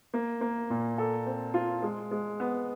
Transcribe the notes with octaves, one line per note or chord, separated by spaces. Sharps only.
A#3
A#3
A#2
A4
C4
F4
G#3
G#3
B3